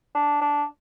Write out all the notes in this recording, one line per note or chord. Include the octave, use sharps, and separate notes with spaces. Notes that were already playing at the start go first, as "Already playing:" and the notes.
D4
D4